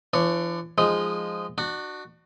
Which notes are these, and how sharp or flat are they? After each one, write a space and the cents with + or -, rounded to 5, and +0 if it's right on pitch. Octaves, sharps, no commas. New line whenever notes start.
E3 +45 D4 +20 C#5 +10
F3 +0 G#3 -5 D#4 +0
D4 +35 F#4 +0